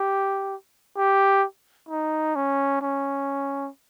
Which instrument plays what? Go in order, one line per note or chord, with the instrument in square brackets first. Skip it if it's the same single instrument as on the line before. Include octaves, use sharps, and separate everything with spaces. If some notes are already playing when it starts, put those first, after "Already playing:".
Already playing: [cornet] G4
G4
D#4
C#4
C#4